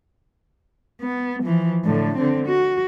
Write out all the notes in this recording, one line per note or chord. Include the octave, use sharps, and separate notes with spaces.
B3
E3 F3
A2 D3
D3 C4
F#4